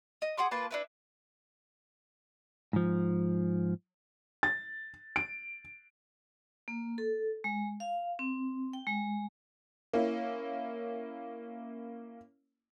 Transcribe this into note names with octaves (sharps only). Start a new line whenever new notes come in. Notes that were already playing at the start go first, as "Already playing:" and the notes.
D#5
G#4 F#5 C6 D6
A#3 F4 B4 A5
D4 E4 B4
G#2 F3
A6
D7
A#3
A4
G#3
F5
C4
G5
G#3
A#3 C#4 E4